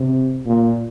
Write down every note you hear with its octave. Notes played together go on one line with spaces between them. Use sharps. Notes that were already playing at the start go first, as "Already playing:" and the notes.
Already playing: C3
A#2